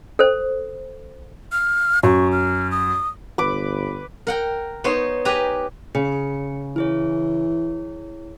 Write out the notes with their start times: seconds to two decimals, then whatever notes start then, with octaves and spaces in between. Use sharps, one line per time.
0.19 A4 C5
1.52 F6
2.03 F#2 C#6
2.32 F6
2.71 D#6
3.38 G1 B4 D6
4.27 A#4 F#5 G5
4.84 B3 D#4 C5 C#5
5.25 G4 B4 G5 G#5 A#5
5.95 C#3 C#7
6.76 E3 E4 G#4 C#5